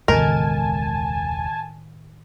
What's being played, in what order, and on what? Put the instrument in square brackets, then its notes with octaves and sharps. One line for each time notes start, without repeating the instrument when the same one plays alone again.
[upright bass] E1 C#2 [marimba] A2 D#3 [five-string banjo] A#4 [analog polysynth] G#5 A5